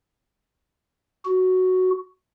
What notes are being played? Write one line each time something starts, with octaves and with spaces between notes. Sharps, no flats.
F#4